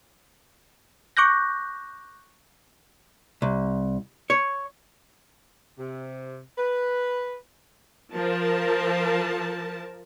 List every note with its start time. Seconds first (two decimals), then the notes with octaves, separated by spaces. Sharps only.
1.17 C#6 D6 F#6 G6 A#6
3.42 C2
4.30 C#5
5.79 C3
6.58 B4
8.14 F3 A#4 A5